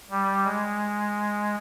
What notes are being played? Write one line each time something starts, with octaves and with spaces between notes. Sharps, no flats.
G3
G#3